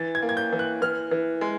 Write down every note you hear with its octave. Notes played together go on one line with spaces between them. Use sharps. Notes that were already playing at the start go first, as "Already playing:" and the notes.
Already playing: E3 A6
G#6
A#3
G#6
G6
E3
F#6
E3 F6
E3
G#3